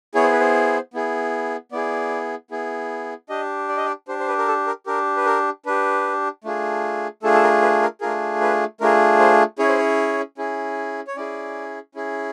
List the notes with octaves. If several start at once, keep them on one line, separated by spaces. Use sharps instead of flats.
B3 E4 G#4 C#5
C5
B4
C5
B3 E4 G#4
B3 E4 G#4 D5
B3 E4 G#4
D4 G4 D#5
D5
D#5
D5
D4 G4 C5
C5
B4
A#4
A4
A#4
D4 G4 A#4
B4
A#4
D4 G4 B4
A3 D4 F4 G#4
A3 D4 F4 G#4 A4
A4
A#4
B4
A#4
A3 D4 F4 G#4 A#4
B4
A3 D4 F4 G#4 A#4
C5
C#4 E4 G#4 C#5
C5
C#5
C#4 E4 G#4
C#5
C#4 E4 G#4 D5
C#4 E4 G#4